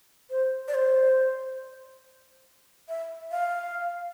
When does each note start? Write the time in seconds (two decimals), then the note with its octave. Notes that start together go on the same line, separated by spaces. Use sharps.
0.30 C5
0.68 D5
0.74 C5
2.89 E5
3.31 F5